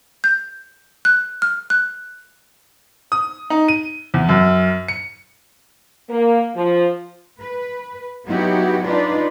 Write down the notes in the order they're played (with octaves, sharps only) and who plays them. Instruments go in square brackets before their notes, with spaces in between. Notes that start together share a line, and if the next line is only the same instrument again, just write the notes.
[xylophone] G6
F#6
F6
F#6
[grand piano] D#6
D#4
D#7
E2
F#2
C#7
[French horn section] A#3
F3
[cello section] B4
F#3 B3 D#4 E4 F#4 G4
D4 D#4 F4 B4 D5